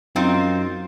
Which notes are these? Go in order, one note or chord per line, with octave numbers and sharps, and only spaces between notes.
F#2 C4 D#4 F4